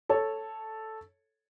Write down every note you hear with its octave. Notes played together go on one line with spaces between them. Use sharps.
A4 C#5